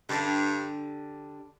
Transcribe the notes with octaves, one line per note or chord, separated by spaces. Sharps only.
G2 D3 G3 D4